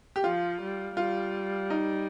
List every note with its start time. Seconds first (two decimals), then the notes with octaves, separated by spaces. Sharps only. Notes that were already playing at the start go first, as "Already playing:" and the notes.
0.16 G4
0.24 F3 F4
0.61 G3
0.96 G3 F4
1.70 D#4